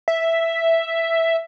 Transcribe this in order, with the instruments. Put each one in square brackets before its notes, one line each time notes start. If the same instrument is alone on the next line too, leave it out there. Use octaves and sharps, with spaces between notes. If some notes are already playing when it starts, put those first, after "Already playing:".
[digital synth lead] E5